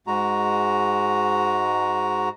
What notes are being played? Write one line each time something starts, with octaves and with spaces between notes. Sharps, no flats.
G#2 G#3 F#4 A#5